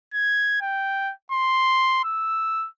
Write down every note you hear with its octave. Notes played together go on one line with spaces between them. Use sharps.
G#6
G5
C6
E6